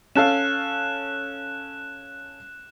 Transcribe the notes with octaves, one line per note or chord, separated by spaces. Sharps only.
C#4 A4 F5 F#6 E7